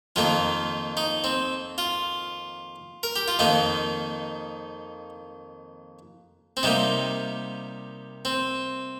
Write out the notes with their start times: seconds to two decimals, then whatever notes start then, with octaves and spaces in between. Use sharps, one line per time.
0.16 F2 D#3 A#3 F4
0.97 D#4
1.24 C4
1.78 F4
3.03 A#4
3.16 G4
3.28 F4
3.39 F2 D#3 A#3 D#4
6.57 C4
6.63 C3 G3 A#3 D#4
8.25 C4